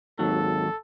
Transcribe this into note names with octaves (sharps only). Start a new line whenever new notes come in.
G#1 D#2 F#3 A4